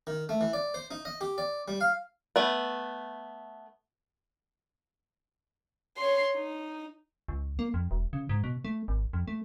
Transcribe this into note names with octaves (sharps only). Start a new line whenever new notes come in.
D#3
A3
E3
D5
C5
D#4
D#5
G4
D5
G3
F5
A3 B3
C#5 C6
D#4
C#2
A#3
F2
E1
C#3
G#2
B2
A3
G#1
F2
A3